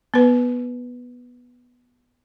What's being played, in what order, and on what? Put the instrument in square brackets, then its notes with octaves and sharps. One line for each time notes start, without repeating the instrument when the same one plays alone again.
[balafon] B3 B4